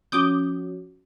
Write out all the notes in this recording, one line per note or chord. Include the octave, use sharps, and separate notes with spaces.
F3 C#4 F#4 D6 D#6 G6